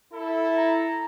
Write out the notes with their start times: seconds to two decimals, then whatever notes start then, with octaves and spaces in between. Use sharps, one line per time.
0.13 E4 A4
0.58 A#5